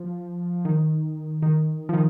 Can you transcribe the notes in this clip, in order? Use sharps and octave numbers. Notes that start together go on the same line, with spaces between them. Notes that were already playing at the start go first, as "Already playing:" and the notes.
Already playing: F3
D#3
D#3
F3
D#3